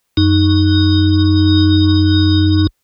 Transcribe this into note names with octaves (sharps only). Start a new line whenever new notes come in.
F#2 D#4